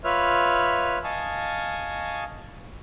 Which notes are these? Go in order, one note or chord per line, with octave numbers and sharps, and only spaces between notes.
F4 B4 C#5 E5 F6
D#5 F5 G#5 A5 C#6 D#6